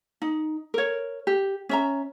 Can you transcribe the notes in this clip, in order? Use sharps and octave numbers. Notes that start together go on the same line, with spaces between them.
D#4
A#4 C#5
G4
C#4 E5 A#5